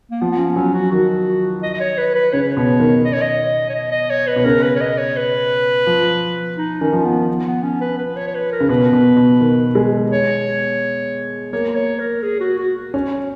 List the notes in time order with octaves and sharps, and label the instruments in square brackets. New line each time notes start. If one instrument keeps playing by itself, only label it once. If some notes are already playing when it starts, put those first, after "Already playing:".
[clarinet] A#3
[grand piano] F3 [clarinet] B3
[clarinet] B3
C#4
[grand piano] F#3 [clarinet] C#4
[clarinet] F#4
[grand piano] D#3 [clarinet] F#4
[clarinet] D#5
D#5
C#5
B4
B4
[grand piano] C#3 [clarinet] C#5
[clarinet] B4
C#5
[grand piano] B2
D#3
[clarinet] D#5
C#5
D#5
C#5
D#5
D#5
C#5
B4
[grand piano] B2
[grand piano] C#3 [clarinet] A#4
[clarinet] B4
C#5
D#5
C#5
B4
[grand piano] F3
[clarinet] D#4
[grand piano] D#3 [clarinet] C#4
[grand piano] F3
[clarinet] B3
B3
C#4
B4
B4
C#5
C#5
B4
A#4
[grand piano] C#3
[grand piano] B2 [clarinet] B4
[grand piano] B2
B2
D#3
G#3
[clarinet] C#5
[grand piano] A#3 [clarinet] C#5
[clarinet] C#5
A#4
G#4
F#4
F#4
[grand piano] C#4